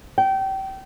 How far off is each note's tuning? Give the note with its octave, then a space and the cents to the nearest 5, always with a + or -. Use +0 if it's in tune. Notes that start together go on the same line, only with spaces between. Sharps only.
G5 -25